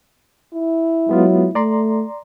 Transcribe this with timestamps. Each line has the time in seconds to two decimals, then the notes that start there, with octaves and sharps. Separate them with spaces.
0.54 E4
1.09 F#3 G#3 B3 F4
1.55 A3 D5 A#5 C6